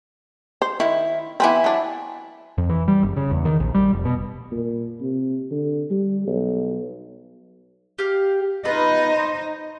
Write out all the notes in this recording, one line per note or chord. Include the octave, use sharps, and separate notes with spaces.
C5
D#3 E4
E3 B3 C4 E4 G#5 B5
F#3 D4
F2
E3
G3
F#1
C#3
E2
D#3
A#1
G3
F1
B2
A#2
C3
D3
G3
B1
G4 F5
B3 D#4 F4 B4 D#5
C5